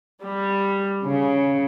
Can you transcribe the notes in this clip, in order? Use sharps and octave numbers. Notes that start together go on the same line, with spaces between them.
G3
C#3